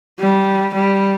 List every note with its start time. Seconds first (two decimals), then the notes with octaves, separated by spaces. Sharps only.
0.19 G3
0.74 G3